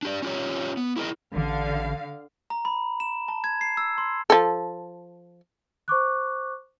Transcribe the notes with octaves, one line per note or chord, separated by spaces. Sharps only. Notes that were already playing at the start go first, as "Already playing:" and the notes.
D4 G4 D5
C#4 F4 G4 C#5
B3
E4 G#4 A#4 D#5
A1 D3 F5
A#5
B5
E7
A5
G#6
C7
E6
C6
F3 A4
C5 C#6 D6 F#6